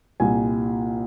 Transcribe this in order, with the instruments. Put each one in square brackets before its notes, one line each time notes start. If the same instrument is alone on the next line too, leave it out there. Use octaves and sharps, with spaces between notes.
[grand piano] C2 A#2 G3 G#5